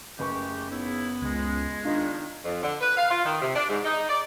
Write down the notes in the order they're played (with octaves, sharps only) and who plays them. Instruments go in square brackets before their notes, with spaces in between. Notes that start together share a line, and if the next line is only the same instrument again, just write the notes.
[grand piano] F#1 B4 C#6 [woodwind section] G#3 A3 G4
[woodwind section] C#3 D#4 E4 [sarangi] B3
[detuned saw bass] C#2 [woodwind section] G#3
[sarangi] D#3 [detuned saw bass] D4 [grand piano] F4
[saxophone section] F2
D3
B4
F5
F4
D#3
C3
D4
G#2
D#4
D5